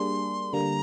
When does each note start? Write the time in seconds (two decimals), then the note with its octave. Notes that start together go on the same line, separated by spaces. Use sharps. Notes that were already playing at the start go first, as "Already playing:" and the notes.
Already playing: G3 A#3 D4 G#4 C6
0.53 D3 G3 A#3 A#5